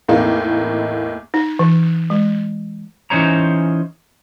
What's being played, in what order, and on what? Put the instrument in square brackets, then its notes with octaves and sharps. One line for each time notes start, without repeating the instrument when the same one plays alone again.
[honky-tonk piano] E2 A2 A#3 C4 D#4
[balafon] D#4
E3
G#3
[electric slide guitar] E3 C#4 D#4 C5 C#5 A#5